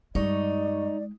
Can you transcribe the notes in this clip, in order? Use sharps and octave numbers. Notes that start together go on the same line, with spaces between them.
G2 G3 G#3 D#4 D5 C#6